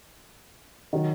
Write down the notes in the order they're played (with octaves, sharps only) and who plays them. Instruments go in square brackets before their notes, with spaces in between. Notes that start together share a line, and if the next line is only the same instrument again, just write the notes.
[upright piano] D#3 F#3